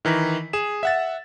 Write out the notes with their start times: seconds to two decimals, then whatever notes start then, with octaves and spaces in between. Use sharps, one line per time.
0.05 D#3 E3 A#5 B6
0.53 G#4 E7
0.83 E5 F#5 A6